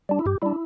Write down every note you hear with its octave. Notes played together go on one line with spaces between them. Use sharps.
G3 D4
E4
G2 G4
G3 D4 E4